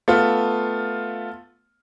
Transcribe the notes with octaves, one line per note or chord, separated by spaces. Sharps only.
A3 B3 F4